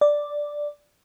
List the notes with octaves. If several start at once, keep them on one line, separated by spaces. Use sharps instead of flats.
D5